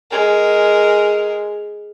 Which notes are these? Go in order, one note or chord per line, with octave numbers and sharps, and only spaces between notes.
G#3 A#4